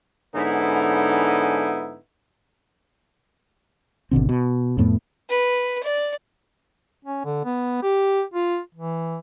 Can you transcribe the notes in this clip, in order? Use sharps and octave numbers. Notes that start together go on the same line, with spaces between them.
G#2 D3 B3 C#4 D#4 E4
G#1 B2 D3 C4
B2
F2 A2 A3 B3
B4
D5
C#4
D3
B3
G4
F4
E3